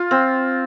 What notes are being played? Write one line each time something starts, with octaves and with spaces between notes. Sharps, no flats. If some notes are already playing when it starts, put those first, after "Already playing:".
Already playing: F4
C4